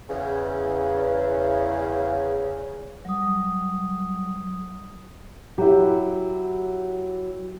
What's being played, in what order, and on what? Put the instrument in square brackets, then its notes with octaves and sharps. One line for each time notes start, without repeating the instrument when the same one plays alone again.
[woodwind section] E2 C#3
[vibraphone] F#3 G3 D#6
[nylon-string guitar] F#3 [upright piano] E4 G4